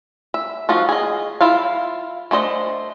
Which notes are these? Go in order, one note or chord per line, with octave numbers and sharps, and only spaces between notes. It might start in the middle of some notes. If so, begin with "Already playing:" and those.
E5
F3 D#4 F4 F#4
G#4 D#5
E4 F4 E5 F5
A3 D4 C5 D#5